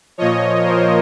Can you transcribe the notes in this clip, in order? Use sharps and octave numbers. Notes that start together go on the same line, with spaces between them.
A#2 F3 C#5 D#5
A#4 C5